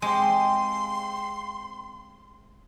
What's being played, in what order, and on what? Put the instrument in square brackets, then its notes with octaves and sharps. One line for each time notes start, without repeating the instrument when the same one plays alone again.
[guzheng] G#3 [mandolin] C4 G4 F5 [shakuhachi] C6